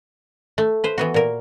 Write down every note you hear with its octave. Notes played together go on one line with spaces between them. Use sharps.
A3
B4 C5
E3 B3 F#4
A#2 A#4